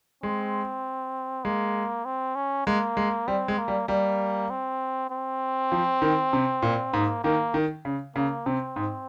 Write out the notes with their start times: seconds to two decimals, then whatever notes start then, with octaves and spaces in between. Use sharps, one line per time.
0.23 G#3 C4
1.45 G#3 A#3
2.05 C4
2.36 C#4
2.67 G#3 A#3
2.97 G#3
3.28 G3 C4
3.48 G#3
3.58 A#3
3.68 G3
3.88 G3 A#3
4.50 C4
5.10 C4
5.72 F3
6.02 D#3
6.33 C3
6.62 A#2
6.93 G#2 A#3
7.24 D#3 A#3
7.54 D#3
7.85 C#3
8.16 C#3 A#3
8.46 C3 C4
8.76 G#2